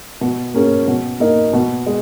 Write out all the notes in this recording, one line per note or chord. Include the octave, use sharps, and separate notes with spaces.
B2
A#3 C#4 G#4
B2
A#3 D#4
B2
G#3